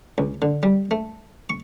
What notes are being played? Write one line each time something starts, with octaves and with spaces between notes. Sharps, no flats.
C#2
D3
G3
A3
C#6